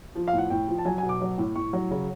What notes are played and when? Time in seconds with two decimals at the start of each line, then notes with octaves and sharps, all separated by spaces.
0.15 F3
0.28 F5
0.33 A2
0.38 F#5
0.50 A2 G5
0.68 F3
0.78 A5
0.85 F#3 G#5
0.98 G#5
1.03 B2
1.09 D6
1.21 F#3
1.38 A2
1.56 A2 C#6
1.73 F#3
1.91 C#3